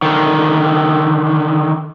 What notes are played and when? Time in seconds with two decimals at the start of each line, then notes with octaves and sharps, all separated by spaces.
0.02 D3 D#3